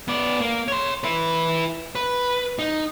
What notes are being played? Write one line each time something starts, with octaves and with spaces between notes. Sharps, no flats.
B3 D5
A#3
C#5 C6
E4 B4
B4
D#4